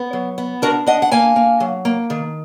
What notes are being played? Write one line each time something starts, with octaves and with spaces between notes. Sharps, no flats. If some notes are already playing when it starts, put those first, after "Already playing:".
Already playing: B3
F#3
B3
D4 F#4 A#4
D4 D#5 F#5
F#5
A#3 F5 G#5
A#3
F#3
A#3
D#3